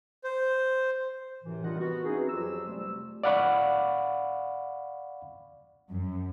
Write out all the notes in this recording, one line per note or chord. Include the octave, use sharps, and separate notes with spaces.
C5
F#2 A2 C3 E3
G3 D4 F4 A#4 D#5 F#5
B3 F#4
E3 C4 C#4 D#4 G#4
F2 F#3 F4 G4 E6
C3 G3 A3
D5 F5 F#5 B5 C#6
F#2